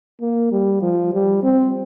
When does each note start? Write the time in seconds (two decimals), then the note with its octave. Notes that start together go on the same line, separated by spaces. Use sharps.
0.21 A#3
0.51 G3
0.82 F3
1.13 G3
1.43 C4